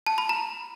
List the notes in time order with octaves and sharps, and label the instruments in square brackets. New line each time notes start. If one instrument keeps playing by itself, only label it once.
[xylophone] A5
B5
A#5